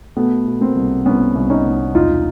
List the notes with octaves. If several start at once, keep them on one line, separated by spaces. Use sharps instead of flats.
B2 A3 B3
B2
A#3 C4
C2
C2 B3 C#4
C2
C#4 D#4
C2
E1 D#4 F4